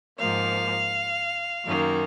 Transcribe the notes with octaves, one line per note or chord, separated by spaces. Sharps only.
G#2 F3 A#3 F5
F#2 D#3 A#3